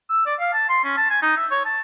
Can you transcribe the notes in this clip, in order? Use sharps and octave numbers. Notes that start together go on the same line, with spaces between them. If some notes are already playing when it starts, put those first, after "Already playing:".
E6
D5
F5
A5
C6
C#4
A5
G#5
D#4
E5
C#5
A5